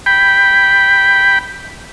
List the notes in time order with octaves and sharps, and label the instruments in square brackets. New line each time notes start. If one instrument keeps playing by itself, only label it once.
[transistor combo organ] G5 B5